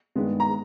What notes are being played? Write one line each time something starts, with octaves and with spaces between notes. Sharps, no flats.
G2 D#3 G#3 B3
A#5